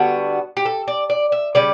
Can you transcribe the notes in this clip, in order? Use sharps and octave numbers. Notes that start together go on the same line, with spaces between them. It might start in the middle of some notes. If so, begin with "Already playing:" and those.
Already playing: D3 G3 B3 F#4
G4
A4
D5
D5
E5
C#3 G3 C#4 D5